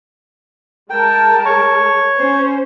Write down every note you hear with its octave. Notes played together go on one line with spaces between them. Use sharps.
G#3 A#4 G5 A5
C#5 C#6
C#4 C5